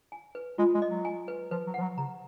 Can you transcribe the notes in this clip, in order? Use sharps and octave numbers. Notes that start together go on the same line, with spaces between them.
G#5
B4
G#3 F4
G#3
D#5
F#3
G#5
B4
F3 B4
F#3
F3 F#5
F#3
C#3 A#5